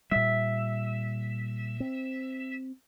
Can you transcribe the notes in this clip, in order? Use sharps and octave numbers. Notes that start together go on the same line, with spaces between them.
A#2 G3 E5
C4